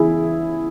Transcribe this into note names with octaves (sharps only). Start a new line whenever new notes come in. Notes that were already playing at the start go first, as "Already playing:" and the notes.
Already playing: E2 C#3 E3 E4 G#4